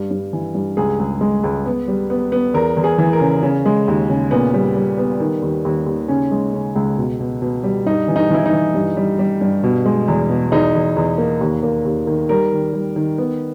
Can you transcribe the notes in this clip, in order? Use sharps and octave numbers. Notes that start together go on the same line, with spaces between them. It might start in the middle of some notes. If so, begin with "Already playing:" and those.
Already playing: G2
G2
E3
G2
C#2 G#4
C#2
G#3
C#2
B3
G3
B3
B3
E2 A#4
E2
G#4
E3
A#4
C#3
C#3
G#3
D#2
C#3
A#2 B3
G3
G3
B3
D#3
D#2
D#2
D#2
C#3 C#4
G#3
C#3
C#2
B2
B2
B2
G3
G2 D#4
E3
D#4
E3 E4
D#4
E3
G2
G3
G3
G2
B2
G#3
E2
B2
E2 D#4
E2
E2
A#3
D#2
A#3
D#2
D#3
G3 A#4
D#3
G3
D#3
B3